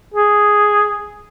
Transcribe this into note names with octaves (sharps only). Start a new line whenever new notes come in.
G#4